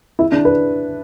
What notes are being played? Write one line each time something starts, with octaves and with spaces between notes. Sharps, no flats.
E4
D4
B4